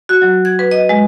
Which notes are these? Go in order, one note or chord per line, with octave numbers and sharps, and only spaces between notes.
F#4
F#3
G#6
B4
D#5
G#3